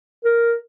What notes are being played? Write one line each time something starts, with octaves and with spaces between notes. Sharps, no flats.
A#4